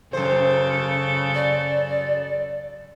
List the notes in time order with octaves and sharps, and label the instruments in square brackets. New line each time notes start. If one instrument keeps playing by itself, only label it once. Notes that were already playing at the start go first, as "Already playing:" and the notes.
[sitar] F#2 C5 [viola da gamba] C#3 A4
[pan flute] D5